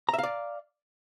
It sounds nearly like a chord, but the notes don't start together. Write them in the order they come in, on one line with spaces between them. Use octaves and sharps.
A#5 E5 F5 D5